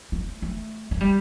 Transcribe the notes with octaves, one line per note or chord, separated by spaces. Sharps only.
A3
A3
A3
G3